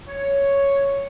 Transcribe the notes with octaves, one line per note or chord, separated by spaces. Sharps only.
C#5